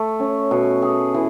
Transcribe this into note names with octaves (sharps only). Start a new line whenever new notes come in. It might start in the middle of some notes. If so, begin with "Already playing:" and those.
Already playing: A3
C#4
B2
G#4
E3